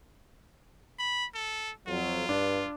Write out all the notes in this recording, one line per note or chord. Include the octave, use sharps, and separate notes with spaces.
B5
A4
F2 F#3 F4
G2 D4